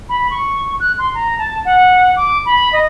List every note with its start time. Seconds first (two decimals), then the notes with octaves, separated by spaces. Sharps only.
0.09 B5
0.31 C#6
0.80 F#6
0.98 C6
1.15 A#5
1.39 A5
1.65 F#5
2.17 D6
2.45 B5
2.73 D#5